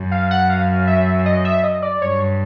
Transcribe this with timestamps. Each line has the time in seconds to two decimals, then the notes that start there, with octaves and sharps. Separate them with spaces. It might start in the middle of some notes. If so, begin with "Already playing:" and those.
Already playing: F#2
0.11 F5
0.31 F#5
0.49 F5
0.87 E5
1.25 D#5
1.45 E5
1.63 D#5
1.82 D5
2.01 G2 C#5